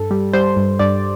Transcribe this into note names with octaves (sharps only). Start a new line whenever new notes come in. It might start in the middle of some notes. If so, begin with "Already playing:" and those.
Already playing: G2 A4
G3
G3 C5
G2
G2 D5